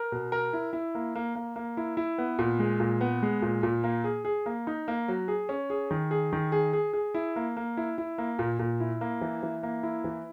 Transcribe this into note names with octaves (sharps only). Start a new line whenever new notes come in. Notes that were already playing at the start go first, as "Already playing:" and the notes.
Already playing: A#4
B2
A#4
E4
E4
A#3
A#3
A#3
A#3
E4
E4
B3
A#2
G#3
A#2
B3
G#3
A#2
A#2
A#3
G#4
G#4
A#3
D#4
A#3
F#3
G#4
C#4
G#4
D#3
G#4
D#3
G#4
G#4
G#4
E4
A#3
A#3
E4
E4
A#3
A#2
A#2
E4
A#3
E3
E3
A#3
E4
E3